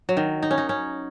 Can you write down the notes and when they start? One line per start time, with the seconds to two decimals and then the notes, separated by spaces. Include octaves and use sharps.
0.09 F#3
0.17 D#3
0.43 D#4
0.51 C#4
0.58 D#4
0.69 C#4